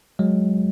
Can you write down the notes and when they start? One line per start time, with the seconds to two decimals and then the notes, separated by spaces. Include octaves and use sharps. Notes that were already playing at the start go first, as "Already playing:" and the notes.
0.19 F#3 G#3